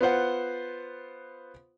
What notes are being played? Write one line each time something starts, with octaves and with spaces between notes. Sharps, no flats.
B3 F4 C5 F#5